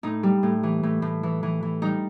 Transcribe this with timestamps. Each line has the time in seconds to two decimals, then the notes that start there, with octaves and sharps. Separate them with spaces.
0.03 A2 D#4
0.23 G3
0.43 A2
0.63 E3
0.83 A2
1.02 A2
1.23 E3
1.43 E3
1.63 E3
1.82 G3 D#4